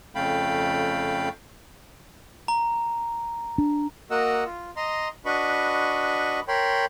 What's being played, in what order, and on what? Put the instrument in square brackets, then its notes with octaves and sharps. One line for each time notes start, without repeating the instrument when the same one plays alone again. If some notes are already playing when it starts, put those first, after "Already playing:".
[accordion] F2 C#3 A3 F5 G5 B5
[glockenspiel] A#5
[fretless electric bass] D4
[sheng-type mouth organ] A#3 F#4 A#4 D#5 F#5 E6
F4
D#5 A#5 C6
D4 F#4 B4 D#5 B5 C#6
A#4 C#5 G5 B5 C6